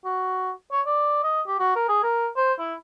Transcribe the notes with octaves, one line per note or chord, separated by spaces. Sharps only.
F#4
C#5
D5
D#5
G4
F#4
A#4
G#4
A#4
C5
E4